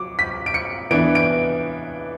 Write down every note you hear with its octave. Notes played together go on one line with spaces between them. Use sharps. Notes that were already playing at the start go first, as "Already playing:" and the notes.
Already playing: F#3 D6
B6
D7
C#7
E3 B3 D4 D7
D7